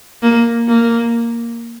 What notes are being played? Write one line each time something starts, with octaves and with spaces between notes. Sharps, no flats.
A#3
A#3